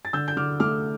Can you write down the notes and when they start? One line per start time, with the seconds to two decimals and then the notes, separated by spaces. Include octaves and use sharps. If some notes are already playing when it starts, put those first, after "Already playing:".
0.05 A6
0.13 D3 E6 G6
0.28 G6
0.37 D3 D6 F6
0.60 A3 D6 F6